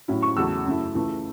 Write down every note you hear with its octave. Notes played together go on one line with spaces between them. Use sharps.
A2 F#3 C#4 E4
C#6
E2 C#3 F#3 A3 E6
F#2 C#3 A3 E4
C#2 C#3 E3 A3